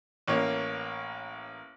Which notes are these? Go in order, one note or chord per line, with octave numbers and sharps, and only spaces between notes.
A1 A#3 C#5